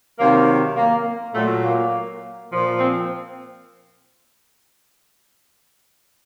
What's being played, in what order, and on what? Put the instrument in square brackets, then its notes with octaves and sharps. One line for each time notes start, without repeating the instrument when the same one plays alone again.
[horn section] C3 D#3 F#3 A#3
A#3
A#2 F#3 A3
A#3
A#2 F3
C4